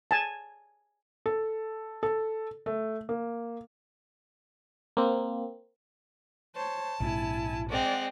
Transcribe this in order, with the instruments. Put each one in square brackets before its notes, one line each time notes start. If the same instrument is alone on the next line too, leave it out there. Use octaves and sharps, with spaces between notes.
[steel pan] G#5 A5
[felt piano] A4
A4
A3
A#3
[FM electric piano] A#3 C4
[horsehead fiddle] C5 C#5 [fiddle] A5
[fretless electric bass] A#1 G#2 C3 [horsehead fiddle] E4 G#5
[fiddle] G#3 C4 [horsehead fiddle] D5 F#5